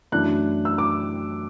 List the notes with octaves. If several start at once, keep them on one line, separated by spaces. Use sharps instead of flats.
F#2 E3 A3 D4 F#6
E6
D6